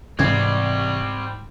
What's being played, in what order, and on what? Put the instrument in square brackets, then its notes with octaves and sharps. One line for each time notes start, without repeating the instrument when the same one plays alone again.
[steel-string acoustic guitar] G#2 [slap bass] C3 E3 G#3 [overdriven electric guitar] G3 C4 [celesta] G#6